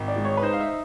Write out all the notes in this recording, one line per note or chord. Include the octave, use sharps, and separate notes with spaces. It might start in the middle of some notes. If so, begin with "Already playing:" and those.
Already playing: G#1
D5
G#3
C#5
B4
D#4 C5
F5
E5